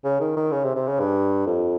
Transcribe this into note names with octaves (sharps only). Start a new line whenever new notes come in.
C#3
D#3
D#3
C#3
C3
C3
C#3
G2
F2